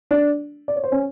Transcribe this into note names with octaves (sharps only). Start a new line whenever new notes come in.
D4 D5
D5
C#5
C5
C#4 C#5